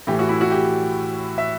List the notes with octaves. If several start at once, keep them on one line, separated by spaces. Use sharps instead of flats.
A2 E3 G4
F#4
E4
F#4
G4
E5